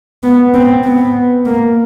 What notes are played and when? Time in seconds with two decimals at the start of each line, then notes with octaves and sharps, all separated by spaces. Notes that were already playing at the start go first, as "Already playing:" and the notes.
0.23 B3
0.54 C4
0.84 B3
1.46 A#3